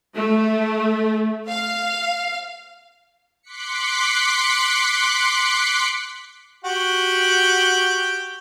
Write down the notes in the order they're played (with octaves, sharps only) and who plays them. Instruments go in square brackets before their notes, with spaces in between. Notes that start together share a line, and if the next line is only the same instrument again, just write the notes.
[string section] A3
F5
[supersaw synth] C6 D6 F#6 B6 C#7
[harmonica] F#4 G4